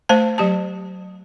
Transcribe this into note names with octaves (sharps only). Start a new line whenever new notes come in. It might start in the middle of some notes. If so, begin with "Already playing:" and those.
A3 C5 A5
F#3 G4 A5